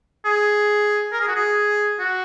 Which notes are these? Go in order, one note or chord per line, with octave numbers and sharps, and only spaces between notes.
G#4
A#4
G#4
F#4
G#4
F#4